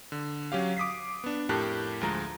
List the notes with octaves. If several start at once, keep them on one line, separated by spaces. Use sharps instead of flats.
D3
F#3 C#4 G4 F5
D6 D#6 B6 C7
B3 D4
F2 A2 G4 A#4 A5 F#6
D2 F3 G#3 A#5